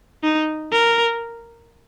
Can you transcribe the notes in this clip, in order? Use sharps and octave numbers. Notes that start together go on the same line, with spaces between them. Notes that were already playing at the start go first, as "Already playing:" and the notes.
D#4
A#4